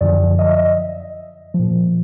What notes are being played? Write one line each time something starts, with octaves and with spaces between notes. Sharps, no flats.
F#2 D3 F3 D5
D#5
E5
D#5
A#2 F3